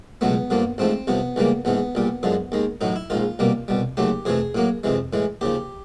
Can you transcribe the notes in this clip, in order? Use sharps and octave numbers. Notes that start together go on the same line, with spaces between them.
C#2 B2 F#3 A3 B3
G2 D3 F3 A#3
A1 G#2 F3 A3 C4
C2 C3 F3 B3
C#2 C#3 E3 G3 A#3
A#1 G#2 E3 B3
A#1 A#2 G3
F#2 D3 F3 G#3
D#2 D#3 G#3
A1 A2 F#3 D#4
E4
A#1 G#2 D#3 F4
C2 B2 G3 A#3
C2 B2 G3
D#2 C#3 F#3 A3 G4
F2 C3 E3 A3 G#4
A2 F#3 A#3
F2 C3 E3 G#3
A2 E3 G#3
D#2 C#3 F3 G4